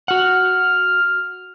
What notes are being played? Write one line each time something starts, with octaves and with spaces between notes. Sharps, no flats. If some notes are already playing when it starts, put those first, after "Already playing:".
F#4 F#5 F6